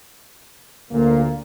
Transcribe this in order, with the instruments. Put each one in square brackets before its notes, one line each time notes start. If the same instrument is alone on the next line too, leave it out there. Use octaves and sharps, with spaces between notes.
[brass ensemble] D2 A#2 [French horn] A#3